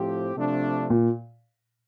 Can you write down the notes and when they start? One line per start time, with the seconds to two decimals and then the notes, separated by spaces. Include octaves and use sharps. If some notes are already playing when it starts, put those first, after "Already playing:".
Already playing: A2 F3 C4 G4
0.36 C3 F3 A3 D4
0.90 A#2